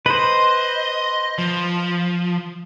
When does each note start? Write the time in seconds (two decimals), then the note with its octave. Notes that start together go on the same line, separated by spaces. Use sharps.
0.06 B4 C5 D#5
1.38 F3